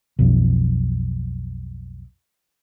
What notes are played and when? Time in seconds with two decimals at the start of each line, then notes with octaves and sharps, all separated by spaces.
0.19 B1 F2